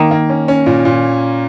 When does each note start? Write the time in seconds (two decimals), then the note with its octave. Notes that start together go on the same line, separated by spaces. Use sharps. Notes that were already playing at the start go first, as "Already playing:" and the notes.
Already playing: D#3 A#3
0.11 A#3
0.29 C#4
0.48 C#4
0.66 A#2
0.85 A#2